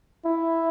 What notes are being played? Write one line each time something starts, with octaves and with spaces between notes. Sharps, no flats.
E4